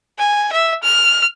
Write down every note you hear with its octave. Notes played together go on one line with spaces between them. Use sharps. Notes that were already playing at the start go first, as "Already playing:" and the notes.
G#5
E5
F6